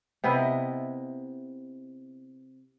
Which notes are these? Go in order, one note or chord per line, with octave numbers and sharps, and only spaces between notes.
C3 B3 E4 D#5